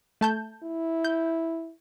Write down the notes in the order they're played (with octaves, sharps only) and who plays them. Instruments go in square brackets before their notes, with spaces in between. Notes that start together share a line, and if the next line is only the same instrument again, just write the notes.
[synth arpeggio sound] A3 A5 G6
[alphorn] E4
[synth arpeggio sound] G6